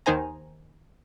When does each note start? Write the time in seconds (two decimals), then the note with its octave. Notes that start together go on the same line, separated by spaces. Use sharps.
0.06 D#2 D#3 D#4 C5 G#5 A#5